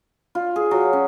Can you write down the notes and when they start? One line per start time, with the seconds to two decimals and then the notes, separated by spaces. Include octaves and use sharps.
0.35 F4
0.56 G#4
0.71 F#3
0.93 C#4